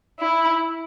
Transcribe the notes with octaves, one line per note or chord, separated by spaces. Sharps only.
E4